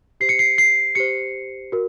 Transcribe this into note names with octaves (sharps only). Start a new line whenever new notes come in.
G4 C5 C7
C#7
C7
C7
G4 C5 C#7
F#4 A#4